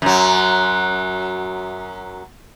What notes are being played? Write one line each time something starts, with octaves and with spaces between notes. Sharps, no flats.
F#2 F#3